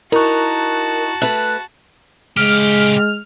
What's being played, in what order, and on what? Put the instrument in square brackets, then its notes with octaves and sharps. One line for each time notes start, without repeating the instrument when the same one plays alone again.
[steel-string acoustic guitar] D#4 [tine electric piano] E4 A#5 C#6 [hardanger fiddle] F#4 A5 [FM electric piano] A#4 F#6
[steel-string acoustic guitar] A3 B4 [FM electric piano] F#6
[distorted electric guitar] C#3 G4 [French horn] G#3 [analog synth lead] F6